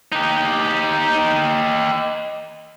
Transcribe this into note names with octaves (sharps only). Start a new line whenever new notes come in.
D#4 G4